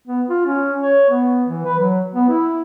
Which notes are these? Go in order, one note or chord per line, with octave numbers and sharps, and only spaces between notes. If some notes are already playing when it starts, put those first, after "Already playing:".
B3
F4
C#4
C#5
B3
E3
B4
F#3
B3
E4